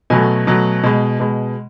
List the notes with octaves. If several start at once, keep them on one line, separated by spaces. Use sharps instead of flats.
B2 F#3 A3 G#5
B2 F#3 A3
B2 G#3
B2 G#3